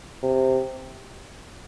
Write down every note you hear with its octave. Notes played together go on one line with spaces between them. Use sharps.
C3